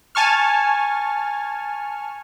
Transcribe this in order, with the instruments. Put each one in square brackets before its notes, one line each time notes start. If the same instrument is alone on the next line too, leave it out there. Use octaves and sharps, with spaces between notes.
[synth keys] G#5 A5 C#6 F6